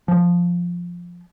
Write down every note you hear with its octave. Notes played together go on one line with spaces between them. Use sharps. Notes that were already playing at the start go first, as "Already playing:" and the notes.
F3